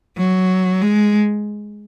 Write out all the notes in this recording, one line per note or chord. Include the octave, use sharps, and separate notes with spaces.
F#3
G#3